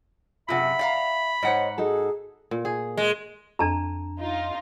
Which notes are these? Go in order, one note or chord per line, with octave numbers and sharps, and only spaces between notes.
F#2 C3 F4 G#4 E5 F#5 B5
D5 F5 A#5
G#2 C5 C#5 D#5 F#5
D#4 F#4 G#4 A4
A#2
G#4
G#3
F2 D4 A5 A#5
D#4 F4